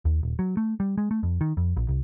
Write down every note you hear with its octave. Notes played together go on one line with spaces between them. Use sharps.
D#2
D#1
F#3
A3
G3
G#3
A3
F2
D#3
F2
A#1
C2